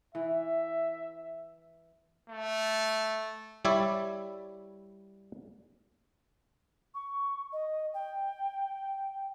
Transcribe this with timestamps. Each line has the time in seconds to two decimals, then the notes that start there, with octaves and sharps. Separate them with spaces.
0.15 E3 E5
2.30 A3
3.65 G3 E4 C#5 D5 E5
6.94 C#6
7.53 D#5
7.94 G5